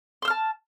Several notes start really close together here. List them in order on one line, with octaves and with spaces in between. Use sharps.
C6 E6 F6 A5